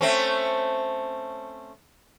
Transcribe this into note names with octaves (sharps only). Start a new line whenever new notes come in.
A3 C4 C#4